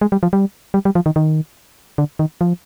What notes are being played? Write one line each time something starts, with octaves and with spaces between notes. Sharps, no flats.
G#3
G3
F3
G3
G3
G3
F3
D#3
D#3
D3
D#3
F3